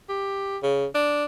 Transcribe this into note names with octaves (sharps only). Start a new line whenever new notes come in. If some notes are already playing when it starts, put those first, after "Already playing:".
G4
C#3
D4